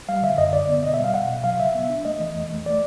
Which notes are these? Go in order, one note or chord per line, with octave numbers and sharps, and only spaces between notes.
G3 F5
D3 E5
F#2 D#5
D3 D5
B3
B2 D#5
E5
G3 F5
B2 F#5
B2
F#3 F5
C#3 E5
B3
D4
A3 D#5
E3
E2
A3
A3 D5